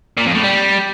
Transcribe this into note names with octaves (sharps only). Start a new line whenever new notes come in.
A#2
F2
A2
G3